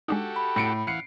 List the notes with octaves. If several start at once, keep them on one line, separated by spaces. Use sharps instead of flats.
G#3 D4 D#4 F#4 G4 A4
B5
A2 C#7 D7
E3 F5 F#5 C7 C#7